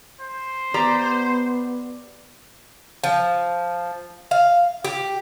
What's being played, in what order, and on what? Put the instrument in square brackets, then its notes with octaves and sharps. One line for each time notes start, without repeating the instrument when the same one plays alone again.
[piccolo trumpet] C5
[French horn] B3 [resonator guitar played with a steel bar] G4 D5 A#5
[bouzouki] F3
F5
G4